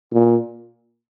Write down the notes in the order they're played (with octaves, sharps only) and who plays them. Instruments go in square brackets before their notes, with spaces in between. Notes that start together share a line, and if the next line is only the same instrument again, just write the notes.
[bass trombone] A#2